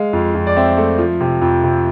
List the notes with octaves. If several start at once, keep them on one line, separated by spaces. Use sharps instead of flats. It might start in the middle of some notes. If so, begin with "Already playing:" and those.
Already playing: G#3 F5
F2
F2
D5
C4 E5
A3
F3
C3
F2
C3